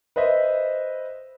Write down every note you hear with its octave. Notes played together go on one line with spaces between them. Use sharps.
B4 C5 D#5 E5